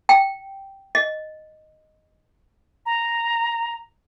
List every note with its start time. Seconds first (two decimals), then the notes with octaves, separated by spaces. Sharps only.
0.09 G5
0.95 D#5
2.86 A#5